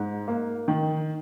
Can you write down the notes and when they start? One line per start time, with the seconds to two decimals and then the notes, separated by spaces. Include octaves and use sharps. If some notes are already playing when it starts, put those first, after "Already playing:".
Already playing: G#2
0.28 A#3
0.68 D#3